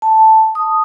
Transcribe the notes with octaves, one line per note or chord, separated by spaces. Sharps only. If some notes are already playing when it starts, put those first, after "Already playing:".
A5
D#6